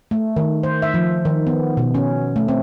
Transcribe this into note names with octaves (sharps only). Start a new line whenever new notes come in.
A3
D#3
C5
E5
F3
D#3
B3
B2
C#4
A3
C4